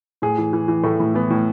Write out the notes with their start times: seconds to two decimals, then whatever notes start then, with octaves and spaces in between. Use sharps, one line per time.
0.22 A2 G#4
0.38 E3
0.53 E3
0.68 E3
0.83 A2 A3
1.00 A2
1.14 E3 B3
1.30 A2